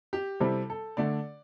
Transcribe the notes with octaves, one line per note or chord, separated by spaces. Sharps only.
G4
C3 G3 C4 E4 A4
A4
D3 A3 D4 D5